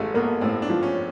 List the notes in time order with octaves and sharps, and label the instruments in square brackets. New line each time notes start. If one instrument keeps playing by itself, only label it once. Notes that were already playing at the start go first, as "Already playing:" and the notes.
Already playing: [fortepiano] A1 [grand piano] G#3 A3
[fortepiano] A#3 [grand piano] B3
[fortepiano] A2 [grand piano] C4
[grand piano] D4
[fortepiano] F3
[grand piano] C#4